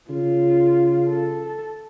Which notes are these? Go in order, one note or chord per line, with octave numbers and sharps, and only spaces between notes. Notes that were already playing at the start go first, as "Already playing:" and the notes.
C#3 F4
A4